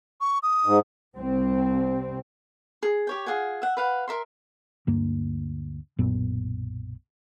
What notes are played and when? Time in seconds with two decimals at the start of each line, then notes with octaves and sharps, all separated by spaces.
0.21 C#6
0.43 D#6
0.65 G#2
1.17 C2 C4
2.83 G#4
3.07 G4 C#5 G5
3.26 F4 G#4 F#5 G#5
3.62 E5 F#5
3.77 B4 F5 F#5
4.08 A#4 E5 C6
4.87 D2 G2 A#3
5.98 B1 F#2 A#2 B3